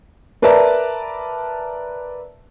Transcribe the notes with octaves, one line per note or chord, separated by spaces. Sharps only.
A#4 B4 D5 E5 A5 A#5